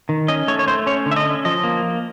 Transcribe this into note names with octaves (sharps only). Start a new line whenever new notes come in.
D#3
C#4 D#5
A3 C#5
C#5
A3 C5
C#4 C#5
D3
E5
D#5
C#4
F3 D#5
A#3